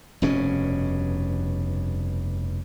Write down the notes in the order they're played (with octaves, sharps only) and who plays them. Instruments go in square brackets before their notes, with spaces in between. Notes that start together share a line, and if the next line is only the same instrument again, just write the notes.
[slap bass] F1 G2 B2 C#4